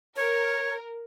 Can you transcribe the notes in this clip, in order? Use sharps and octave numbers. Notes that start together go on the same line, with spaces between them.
A#4 C#5